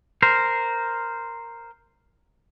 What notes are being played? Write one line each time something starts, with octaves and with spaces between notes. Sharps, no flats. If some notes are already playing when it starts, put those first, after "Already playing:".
A#4 C5